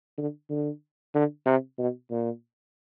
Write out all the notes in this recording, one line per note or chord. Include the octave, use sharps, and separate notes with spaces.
D3
D3
D3
C3
B2
A#2